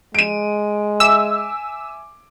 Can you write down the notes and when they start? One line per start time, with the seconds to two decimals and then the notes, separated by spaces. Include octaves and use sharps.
0.15 G#3 D7 D#7
1.00 E5 G#5 D6 E6